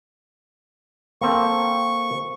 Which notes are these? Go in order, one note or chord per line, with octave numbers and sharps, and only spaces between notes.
A#3 C4 A4 C#6